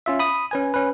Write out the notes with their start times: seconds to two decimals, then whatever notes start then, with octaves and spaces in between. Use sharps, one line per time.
0.06 C#4 F4 E5
0.19 B5 D#6
0.51 C#4 B4 G#5
0.74 C#4 B4